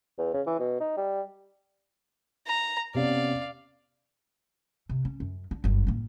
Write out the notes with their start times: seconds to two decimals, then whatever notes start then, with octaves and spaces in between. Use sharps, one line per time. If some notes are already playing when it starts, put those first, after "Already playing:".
0.18 E2
0.34 C#3
0.47 E3
0.59 B2
0.80 D#4
0.97 G3
2.47 A#5
2.94 C3 B3 C#4 D5 F5
4.89 C3
5.05 C#4
5.20 F#2
5.51 D4
5.64 G1 F#2
5.87 A2 A#3